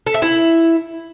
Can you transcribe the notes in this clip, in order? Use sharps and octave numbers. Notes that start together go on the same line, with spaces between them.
A4
E5
E4